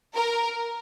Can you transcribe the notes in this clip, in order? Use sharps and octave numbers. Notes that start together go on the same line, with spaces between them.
A#4